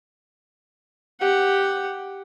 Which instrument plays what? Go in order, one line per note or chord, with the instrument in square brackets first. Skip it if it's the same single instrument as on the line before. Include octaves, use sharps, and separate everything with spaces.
[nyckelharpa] G4 F#5